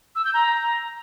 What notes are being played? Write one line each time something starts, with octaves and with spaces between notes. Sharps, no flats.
E6
G6
A#5